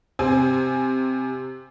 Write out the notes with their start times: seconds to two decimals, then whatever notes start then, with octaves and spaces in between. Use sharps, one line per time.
0.19 C3 C4 G#5